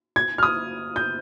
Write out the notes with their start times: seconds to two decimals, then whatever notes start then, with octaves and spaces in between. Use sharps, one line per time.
0.16 G#6
0.38 F6
0.43 D#6
0.96 G6